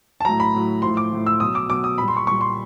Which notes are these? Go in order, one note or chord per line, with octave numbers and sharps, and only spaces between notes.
A5
A2 F#3 A#5
B5
A2 F#3
A2 F3 C6
D6
A2 F3
E6
B2 F#3 D#6
D6
B2 F#3 D6
D#6
A#2 G3 B5
C6
C#6
A#2 G3 C#6
C6